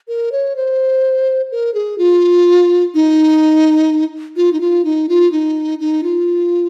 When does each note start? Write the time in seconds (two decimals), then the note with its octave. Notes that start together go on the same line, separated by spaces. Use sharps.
0.08 A#4
0.32 C#5
0.56 C5
1.52 A#4
1.74 G#4
1.98 F4
2.94 D#4
4.36 F4
4.53 D#4
4.61 F4
4.85 D#4
5.09 F4
5.32 D#4
5.80 D#4
6.03 F4